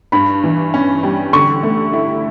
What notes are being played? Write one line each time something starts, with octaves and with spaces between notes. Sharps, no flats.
G2 B5
E3
C#4
G3
D3 C#6
A3
E4